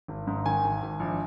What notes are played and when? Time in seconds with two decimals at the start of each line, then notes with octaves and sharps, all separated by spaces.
0.08 G#1
0.27 G#2
0.46 D#3 G#5
0.64 G#1
0.82 G#1
1.00 A#1